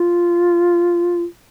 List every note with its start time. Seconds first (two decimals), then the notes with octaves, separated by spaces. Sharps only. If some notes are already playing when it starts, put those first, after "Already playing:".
Already playing: F4